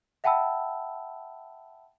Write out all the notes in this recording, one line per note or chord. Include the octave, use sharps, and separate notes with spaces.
E5 F#5 G5 A5 B5 E6